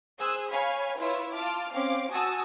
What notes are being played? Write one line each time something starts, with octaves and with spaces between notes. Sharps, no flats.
G#4 C5 G#5 E6 F#6
C#5 F5 G#5 B5 F6
E4 F4 B4 C#5 E6
F4 A5 D6 F6
C4 C#4 F5 D6
F#4 G#5 A5 D#6 E6